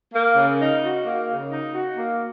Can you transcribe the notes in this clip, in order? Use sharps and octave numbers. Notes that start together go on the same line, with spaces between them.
A#3
C#3
D#4
F#4
A#3
C#3
D#4
F#4
A#3